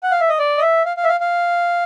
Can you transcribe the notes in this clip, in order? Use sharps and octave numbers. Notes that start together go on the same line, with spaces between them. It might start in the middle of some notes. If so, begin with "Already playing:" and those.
F#5
F5
E5
D#5
D5
D#5
E5
F5
F5
E5
F5
F5